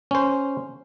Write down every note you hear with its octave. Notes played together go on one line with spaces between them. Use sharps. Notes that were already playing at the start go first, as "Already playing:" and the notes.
C#4 C5